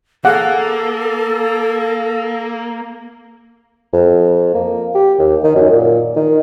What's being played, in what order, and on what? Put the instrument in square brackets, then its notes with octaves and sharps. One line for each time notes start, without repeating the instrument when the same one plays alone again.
[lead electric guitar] A#3 [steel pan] G#4 F5 F#5 [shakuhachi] A4
[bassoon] F2
A#3
G4
D#2
D#3
F#2
A#2
D#3